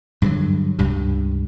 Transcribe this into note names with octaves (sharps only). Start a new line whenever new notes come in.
G2 D3 E3 F#3
C#2 G2 C3